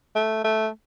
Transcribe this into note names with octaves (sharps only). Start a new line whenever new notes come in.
A3
A3